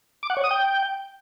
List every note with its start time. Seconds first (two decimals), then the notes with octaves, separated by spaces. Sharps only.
0.23 D6
0.30 F#5
0.37 C#5
0.44 D#6
0.51 G5